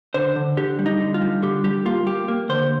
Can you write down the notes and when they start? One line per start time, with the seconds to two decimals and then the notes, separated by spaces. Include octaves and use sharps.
0.14 D3 C5
0.36 D3
0.57 D3 G4
0.79 G3
0.86 D#4
1.00 D3
1.14 F4
1.21 G3
1.42 D3 G4
1.64 G3 G4
1.85 A#3 F4
2.06 A#3 G4
2.28 A#3
2.49 D3 C5